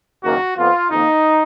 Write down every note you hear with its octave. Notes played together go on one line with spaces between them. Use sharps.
F#1 F#2 D#3 A#3 F#4
F2 F3 B3 F4
F2 D#3 A#3 D#4